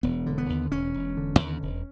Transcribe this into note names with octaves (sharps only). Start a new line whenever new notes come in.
E1 B3
D3
B3
D#2
E1 C#4
E1
D3
D#2
E1